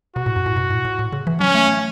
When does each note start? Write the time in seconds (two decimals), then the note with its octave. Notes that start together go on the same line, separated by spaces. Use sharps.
0.16 B2 F#4
0.26 A2
0.36 F#2
0.46 A2
0.57 B2
0.70 A2
0.85 A2
0.99 A2
1.12 C#3
1.27 E3
1.40 F#3 C#4
1.55 A3
1.68 A3